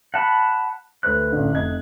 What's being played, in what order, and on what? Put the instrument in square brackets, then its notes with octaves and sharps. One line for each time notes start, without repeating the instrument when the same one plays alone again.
[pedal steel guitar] F#5 A5 B5
[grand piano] D2 B4 C5 [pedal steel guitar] F#6
[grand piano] A1 D3
F1 D#5 G#6